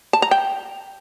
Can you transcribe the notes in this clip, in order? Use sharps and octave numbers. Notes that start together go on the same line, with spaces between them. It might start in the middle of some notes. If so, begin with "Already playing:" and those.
A5
A#5
G5